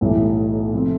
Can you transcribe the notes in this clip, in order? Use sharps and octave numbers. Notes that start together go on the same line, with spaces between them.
B1 A2 E3 G3
C3 F3 A3 C4